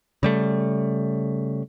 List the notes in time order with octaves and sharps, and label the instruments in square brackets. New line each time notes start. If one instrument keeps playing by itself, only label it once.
[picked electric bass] C#3 G3 A3